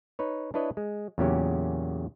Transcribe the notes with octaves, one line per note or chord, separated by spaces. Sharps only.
D#4 B4 C#5
D4 E4 B4 C#5 D#5
G#3
E2 A#2 C#3 F#3 C#4 G4